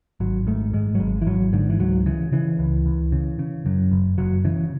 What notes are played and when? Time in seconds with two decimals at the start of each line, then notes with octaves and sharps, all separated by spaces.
0.20 G#1 F#3
0.47 G#2 A3
0.73 G#2 G#3
0.95 F#3
1.00 G#1 G#3
1.22 E3
1.27 G#1 F#3
1.53 G#2 D3
1.69 E3
1.79 C#2 F#3
2.06 C#3 E3
2.33 C#3 E3
2.59 C#2
2.86 C#2
3.12 C#3
3.39 C#3
3.66 F#2
3.92 F#1
4.18 F#1 F#3
4.45 C#3 E3